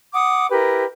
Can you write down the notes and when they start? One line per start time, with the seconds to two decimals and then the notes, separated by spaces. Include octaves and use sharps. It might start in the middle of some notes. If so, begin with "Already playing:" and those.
0.14 F#5 D6 D#6
0.51 E4 G4 A#4 B4